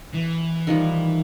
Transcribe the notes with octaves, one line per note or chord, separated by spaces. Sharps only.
E3
D#3 F3 G3